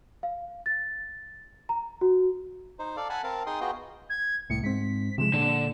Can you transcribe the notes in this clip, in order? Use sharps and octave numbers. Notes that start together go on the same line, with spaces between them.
F5
A6
A#5
F#4
D#4 C5
A4 D5 F5
F#5 G#5 A5 B5
C4 A#4 F5 A5
D#4 G#4 G5 C6 D#6
B3 F4 F#4 G#4 D#5 G5
G#6
C2 A2 C#7
G#2 C4 B6
C3 F3 G#3 E7
A#2 D3